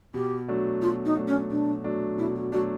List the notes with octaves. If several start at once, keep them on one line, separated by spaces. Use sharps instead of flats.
B2 G4
F#3 A3 D4
B2 F4
D#4
F#3 A3 D4
C#4
B2 D4
F#3 A3 D4
B2 E4
F#4
F#3 A3 D4 F#4